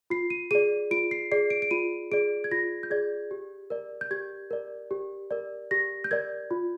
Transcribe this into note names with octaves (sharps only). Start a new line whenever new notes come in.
F4 C7
D#7
G#4 D5 D#7
F4 D7
C7
G#4 D5 C7
D7
D7
F4 D#7
G#4 D5 D7
G#6
F4 A#6
G6
G#4 D5 G#6
G4
A#4 D5
G6
G4 G#6
A#4 D5
G4
A#4 D5
G4 A#6
G6
A#4 D5 G#6
F4